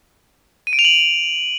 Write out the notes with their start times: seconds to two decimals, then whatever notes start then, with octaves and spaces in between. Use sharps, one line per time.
0.67 D#7
0.73 D7
0.79 F7
0.85 F#7